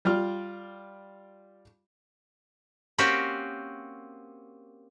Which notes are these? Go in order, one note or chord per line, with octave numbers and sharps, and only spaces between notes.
G3 F4 D5 F6
A#3 C4 C#4 F#4 G4